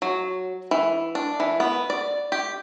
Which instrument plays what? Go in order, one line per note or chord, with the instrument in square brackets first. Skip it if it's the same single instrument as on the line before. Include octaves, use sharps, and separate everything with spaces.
[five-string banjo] F#3
E3
D4
E3
B3
D5
G4